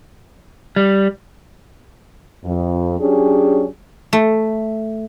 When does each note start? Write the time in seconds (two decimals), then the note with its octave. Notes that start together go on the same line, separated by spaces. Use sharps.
0.76 G3
2.45 F2
3.00 F#3 C#4 D4 G4 G#4
4.13 A3